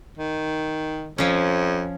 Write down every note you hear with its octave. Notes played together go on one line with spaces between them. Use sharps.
D#3
F2 F3 C#4